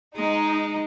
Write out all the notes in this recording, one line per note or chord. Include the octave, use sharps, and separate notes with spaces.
G#3 D#4